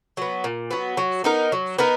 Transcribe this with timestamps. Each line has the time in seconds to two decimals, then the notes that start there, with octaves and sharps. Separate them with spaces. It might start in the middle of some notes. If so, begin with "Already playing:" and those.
0.17 F#3 B3
0.44 A#2
0.71 F#3 B3
0.97 F#3
1.24 B3 D#4 A#4
1.52 F#3
1.79 B3 D#4 A#4